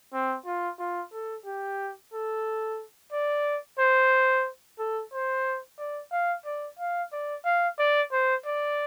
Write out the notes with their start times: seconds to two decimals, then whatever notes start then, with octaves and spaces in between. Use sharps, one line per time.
0.13 C4
0.46 F4
0.79 F4
1.13 A4
1.46 G4
2.13 A4
3.12 D5
3.79 C5
4.79 A4
5.13 C5
5.78 D5
6.12 F5
6.45 D5
6.79 F5
7.13 D5
7.45 F5
7.79 D5
8.12 C5
8.45 D5